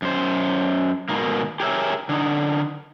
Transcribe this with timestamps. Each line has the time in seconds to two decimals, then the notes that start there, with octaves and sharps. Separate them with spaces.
0.02 F#2 C5
1.09 G#2 B2 D#3 A#3
1.60 G4 G#4 A#4 C#5 E5
2.09 D3 D#4